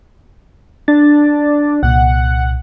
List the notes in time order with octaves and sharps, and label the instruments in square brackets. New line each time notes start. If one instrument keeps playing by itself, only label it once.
[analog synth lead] D4 [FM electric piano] A6
[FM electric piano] C2 A#2 [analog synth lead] F#5